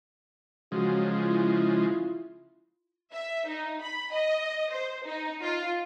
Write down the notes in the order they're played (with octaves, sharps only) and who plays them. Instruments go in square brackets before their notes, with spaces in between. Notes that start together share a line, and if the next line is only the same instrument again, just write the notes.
[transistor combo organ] C#3 F3 G#3 [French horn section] F#3 F#4
[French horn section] E4 F4
[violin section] E5
D#4
B5
D#5
C5
D#4
F4